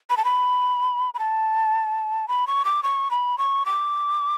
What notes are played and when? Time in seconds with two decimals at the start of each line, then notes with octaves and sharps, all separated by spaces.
0.10 B5
0.17 A5
0.25 B5
1.14 B5
1.19 A5
2.28 B5
2.47 C#6
2.65 D6
2.83 C#6
3.11 B5
3.38 C#6
3.66 D6